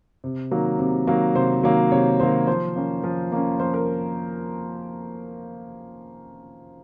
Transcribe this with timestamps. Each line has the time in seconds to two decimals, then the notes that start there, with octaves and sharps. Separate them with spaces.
0.24 C3
0.51 D#3 F#3 A#3
0.79 C3
1.07 D#3 F#3 A#3
1.35 C3 C5
1.63 D#3 F#3 A#3 C#5
1.92 C3 C#5
2.20 D#3 F#3 A#3 C5
2.47 F3 C5
2.76 A#3 C#4
3.04 F3
3.32 A#3 C#4
3.60 F3 C5
3.74 A#4